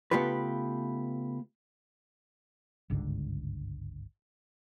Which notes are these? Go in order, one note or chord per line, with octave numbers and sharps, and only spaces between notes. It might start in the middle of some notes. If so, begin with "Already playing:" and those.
C#3 A3 B3 F4 G4 B4
G1 C#2 G#2 D3